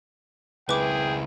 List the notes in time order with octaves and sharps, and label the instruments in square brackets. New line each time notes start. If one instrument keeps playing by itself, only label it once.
[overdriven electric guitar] C#2 E4 [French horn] G#4 [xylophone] B4 D6 [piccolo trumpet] G5